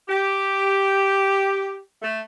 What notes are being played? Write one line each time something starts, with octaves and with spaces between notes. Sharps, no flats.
G4
A3